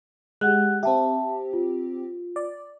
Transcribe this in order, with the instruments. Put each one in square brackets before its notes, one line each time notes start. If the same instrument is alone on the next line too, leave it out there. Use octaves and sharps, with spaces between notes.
[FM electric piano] G#3 [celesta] G4 F#5 F#6
[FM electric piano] C4 G4 [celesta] E5 A5
[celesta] F4
[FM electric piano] D5